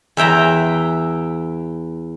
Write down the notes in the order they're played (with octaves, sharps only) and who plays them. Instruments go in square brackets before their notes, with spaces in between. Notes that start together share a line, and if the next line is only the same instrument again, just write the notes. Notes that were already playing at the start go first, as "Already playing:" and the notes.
[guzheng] E2 E5 G5 A#5